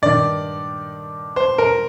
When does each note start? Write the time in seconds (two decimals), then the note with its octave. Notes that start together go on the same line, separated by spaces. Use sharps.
0.02 G2 D#3 D5
1.36 C5
1.58 A#4